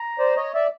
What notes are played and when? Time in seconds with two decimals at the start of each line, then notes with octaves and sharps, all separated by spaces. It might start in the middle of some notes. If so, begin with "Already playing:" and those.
Already playing: A#5
0.18 C5 D5
0.36 C#5 D#5
0.54 D5 E5